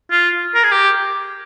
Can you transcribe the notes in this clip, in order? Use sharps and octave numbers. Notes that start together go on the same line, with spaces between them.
F4
A#4
G#4
G4